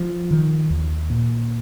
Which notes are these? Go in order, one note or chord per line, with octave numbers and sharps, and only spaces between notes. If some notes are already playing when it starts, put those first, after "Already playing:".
Already playing: F3
D#3
D#2
A#2